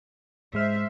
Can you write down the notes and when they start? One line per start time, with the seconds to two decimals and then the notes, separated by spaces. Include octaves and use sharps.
0.54 G#2 G#3 C5 E5 F6